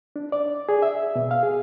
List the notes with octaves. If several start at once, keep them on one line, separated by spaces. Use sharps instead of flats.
D4
D5
G#4
E5
B2
F5
G#4